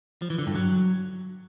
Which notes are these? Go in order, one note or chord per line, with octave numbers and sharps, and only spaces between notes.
F3
E3
D3
G2
F#3